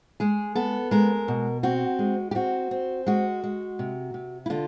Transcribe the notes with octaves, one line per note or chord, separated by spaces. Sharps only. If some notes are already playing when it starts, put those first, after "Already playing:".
G#3 G#4
B3 A4
G#3 A#4
B2
C4 F#4
G#3
G4
C4 F#4
C4
G#3 F#4
G#3
C3
C3
E4
D3 F4